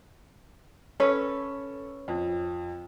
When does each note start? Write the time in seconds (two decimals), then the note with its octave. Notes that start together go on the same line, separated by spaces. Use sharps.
1.00 C#4 A4 B4 C#5
2.08 F2